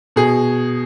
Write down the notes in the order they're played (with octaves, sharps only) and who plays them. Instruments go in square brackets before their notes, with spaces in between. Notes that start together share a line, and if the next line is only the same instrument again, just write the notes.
[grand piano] B2 G#4